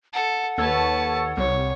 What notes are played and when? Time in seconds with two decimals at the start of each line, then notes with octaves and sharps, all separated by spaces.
0.14 A4 F#5
0.58 D#2 A4 B4 C#5 A5
1.37 C2 C#5